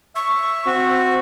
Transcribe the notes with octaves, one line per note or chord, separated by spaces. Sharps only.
E5 C#6
C4 F#4